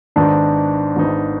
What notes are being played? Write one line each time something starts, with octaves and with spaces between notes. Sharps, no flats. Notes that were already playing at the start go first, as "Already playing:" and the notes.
G#1 G#2 D#3 B3 D4 D#4
G#1 G#2 D#3 B3 D#4